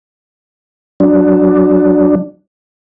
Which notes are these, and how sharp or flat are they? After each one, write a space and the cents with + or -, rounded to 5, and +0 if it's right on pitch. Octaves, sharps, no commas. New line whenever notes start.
F#3 +0 D4 +0